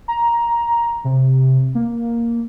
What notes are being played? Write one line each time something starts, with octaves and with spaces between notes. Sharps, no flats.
A#5
C3
A#3